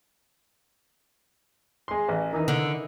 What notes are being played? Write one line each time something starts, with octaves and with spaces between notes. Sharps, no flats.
G#3 C6
A1
D#3 E3 D#4
D3